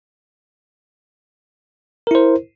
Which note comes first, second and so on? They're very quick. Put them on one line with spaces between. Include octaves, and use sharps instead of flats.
A#4 E4 C5